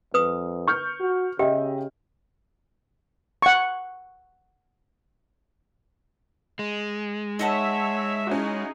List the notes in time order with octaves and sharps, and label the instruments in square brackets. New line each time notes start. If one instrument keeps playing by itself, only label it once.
[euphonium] F2 [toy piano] B4 D#6
[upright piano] C#6 F6 G6
[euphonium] F#4
[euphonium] C#3 [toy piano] G4 [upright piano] D#5 E5 G5
[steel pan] F#5 C#6
[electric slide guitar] G#3
[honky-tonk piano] D#4 [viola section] C#5 E5 [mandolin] D#5 F#5 A5
[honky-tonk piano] C#4 E4 F#4 [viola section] D#4 G#4